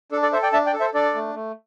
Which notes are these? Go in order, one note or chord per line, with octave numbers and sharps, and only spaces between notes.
D4 A4
A4 D5
A4 C5 E5
D5 G5
D4 E5 A5
D5 G5
A4
C5 E5
D4 A4 D5
A3
A3